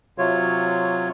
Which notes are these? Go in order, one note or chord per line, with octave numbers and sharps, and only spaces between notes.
C3 F#3 F4 C#5